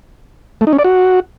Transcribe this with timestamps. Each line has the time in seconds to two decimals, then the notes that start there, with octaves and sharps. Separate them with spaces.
0.61 A3
0.67 D#4
0.73 C#4
0.79 D5
0.84 F#4